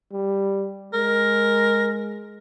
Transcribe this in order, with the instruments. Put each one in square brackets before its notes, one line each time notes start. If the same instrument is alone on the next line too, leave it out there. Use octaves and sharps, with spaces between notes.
[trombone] G3
[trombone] G#3 [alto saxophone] A#4